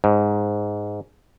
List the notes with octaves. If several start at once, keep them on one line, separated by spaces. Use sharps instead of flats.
G#2